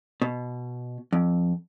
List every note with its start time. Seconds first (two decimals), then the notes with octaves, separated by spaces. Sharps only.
0.22 B2
1.13 F2